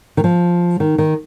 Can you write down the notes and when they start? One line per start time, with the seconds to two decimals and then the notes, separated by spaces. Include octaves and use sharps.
0.17 D#3
0.24 F3
0.80 D#3
0.98 D#3